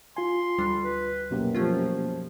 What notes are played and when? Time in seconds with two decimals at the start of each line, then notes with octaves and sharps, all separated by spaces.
0.17 F4 G#5 C6
0.58 D2 G3 D4
0.84 B4
1.31 F#2 B2 A#3 G4
1.55 F3 A3 C#4 F4